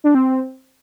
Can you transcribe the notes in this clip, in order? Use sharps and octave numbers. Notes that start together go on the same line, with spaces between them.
D4
C4